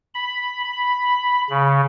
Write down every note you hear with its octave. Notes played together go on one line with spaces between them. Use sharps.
B5
B5
C#3